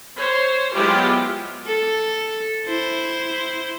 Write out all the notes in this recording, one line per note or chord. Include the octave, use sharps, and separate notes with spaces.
C5 C#5
F#3 G#3 B3 E4 F4 G4
A4
E4 C5